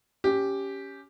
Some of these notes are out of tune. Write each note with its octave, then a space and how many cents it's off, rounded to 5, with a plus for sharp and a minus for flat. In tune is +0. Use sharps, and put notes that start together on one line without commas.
C#4 +10 G4 +0